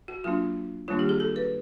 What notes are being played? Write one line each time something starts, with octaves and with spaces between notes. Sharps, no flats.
F#4
F#3 A#3 D4 F4
D#3 G3 A#3 D4 F4
G4
G#4
A4
B4